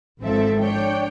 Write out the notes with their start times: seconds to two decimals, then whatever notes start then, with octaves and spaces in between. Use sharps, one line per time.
0.20 G#1 F3 C4 A4 E5
0.58 D4 C#5 G5